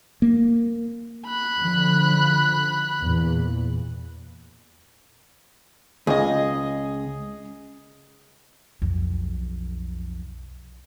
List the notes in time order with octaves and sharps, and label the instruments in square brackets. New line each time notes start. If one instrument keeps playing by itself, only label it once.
[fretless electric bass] A#3
[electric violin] B5 F#6
[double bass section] D3 F3
E2 A#2
[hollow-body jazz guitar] C#2 [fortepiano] G#4 D#5
[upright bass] B1 F2